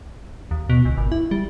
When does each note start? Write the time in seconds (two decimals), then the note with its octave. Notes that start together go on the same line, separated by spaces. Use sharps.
0.51 D#2
0.70 B2
0.85 C#2
0.98 G#1
1.12 E4
1.31 G3